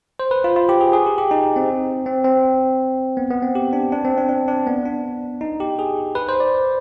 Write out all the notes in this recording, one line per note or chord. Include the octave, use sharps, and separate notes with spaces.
C5
B4
F4
F4
G4
G#4
G#4
G4
G4
D#4
C4
C4
C4
B3
B3
C4
G4
D4
D4
C4
D4
D4
D4
B3
D4
D#4
G4
G#4
B4
C5
D5